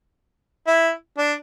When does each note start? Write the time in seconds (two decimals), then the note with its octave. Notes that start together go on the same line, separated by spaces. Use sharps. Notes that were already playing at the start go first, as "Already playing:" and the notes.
0.67 E4
1.18 D4